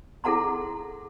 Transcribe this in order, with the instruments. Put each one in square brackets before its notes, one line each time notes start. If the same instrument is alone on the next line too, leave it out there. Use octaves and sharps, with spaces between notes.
[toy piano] E4 G#4 A4 F#5 A#5 C6